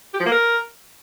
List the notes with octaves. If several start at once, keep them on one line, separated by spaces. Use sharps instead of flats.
G4
F3
A#3
A#4